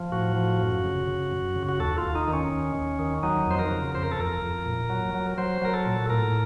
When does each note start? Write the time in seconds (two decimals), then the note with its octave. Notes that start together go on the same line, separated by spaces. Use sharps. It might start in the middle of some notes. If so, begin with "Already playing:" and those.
Already playing: F3
0.12 A2 F#4
0.36 F3
0.61 F#2
0.84 C#3
1.07 C#3
1.31 F#2
1.56 C#3
1.69 F#4
1.80 D#2 A4
1.98 F4
2.04 D#2
2.15 D#4
2.28 D#3
2.33 C#4
2.51 D#2
2.75 D#2
2.99 D#3
3.23 F#3 D#4
3.47 F2 C5
3.59 A#4
3.71 C#3
3.95 F2 C5
4.03 A#4
4.12 A4
4.19 F2 A#4
4.42 F2
4.66 A#2
4.90 F#3
5.14 F#3
5.38 F#3 C5
5.62 F#3 A#4
5.74 A4
5.86 A#2
6.10 A2 A#4